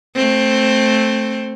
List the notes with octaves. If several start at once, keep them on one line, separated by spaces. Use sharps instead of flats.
A3 C4